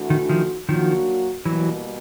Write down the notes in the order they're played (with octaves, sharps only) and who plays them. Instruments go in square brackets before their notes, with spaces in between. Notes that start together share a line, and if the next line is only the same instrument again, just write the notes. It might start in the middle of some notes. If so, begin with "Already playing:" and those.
Already playing: [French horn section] E3 A3 D4 F#4
[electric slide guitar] D#3
D#3 F3
[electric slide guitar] D#3 F3 [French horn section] F#3 A#3 D4 F#4
[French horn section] B2 G3 A#3 [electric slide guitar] E3 F#3